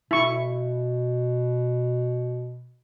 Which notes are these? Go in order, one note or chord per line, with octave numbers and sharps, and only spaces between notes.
B2 E4 C#6